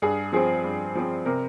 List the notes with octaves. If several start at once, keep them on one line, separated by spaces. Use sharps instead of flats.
G2 G#4
F3 C4 G#4
G2
F3 C4
C3 A#4